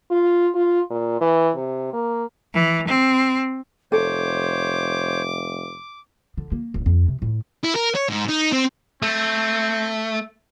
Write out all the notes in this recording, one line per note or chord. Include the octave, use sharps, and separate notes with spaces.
F4
F4
A#2
E3
C3
A#3
E3
C4
F1 A4 C5 C#5 D6
D3
A#3
D1
F2
C3
A2
E4
A#4
C#5
G#2
D#4
C4
A3 C4